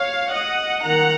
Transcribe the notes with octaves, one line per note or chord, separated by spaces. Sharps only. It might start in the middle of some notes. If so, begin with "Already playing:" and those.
Already playing: C#5 F5
D#5 F#5
D#3 A#3 F#5 A#5